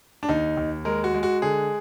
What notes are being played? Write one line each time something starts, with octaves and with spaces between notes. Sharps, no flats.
D4
D#2 D#4
D#2
G#3 A#4
F#4
G#3
F#4
D3 G#4